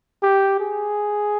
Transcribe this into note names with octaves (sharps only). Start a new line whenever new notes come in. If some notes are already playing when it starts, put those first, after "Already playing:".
G4
G#4